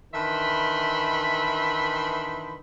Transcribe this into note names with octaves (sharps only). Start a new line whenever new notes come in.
D#3 E3 D4 E5 B5 C6